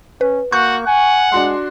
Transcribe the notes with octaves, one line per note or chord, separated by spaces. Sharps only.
C#4 B4
A#3 F#4 C#6 F#6 G6
F#5 G#5
G#3 D4 F#4 C6